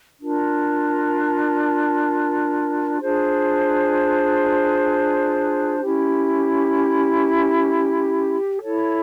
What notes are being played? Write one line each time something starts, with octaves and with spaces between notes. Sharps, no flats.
D4 F4 A#4
D4 F4 G#4 C5
C#4 E4 G4
E4 A4 C#5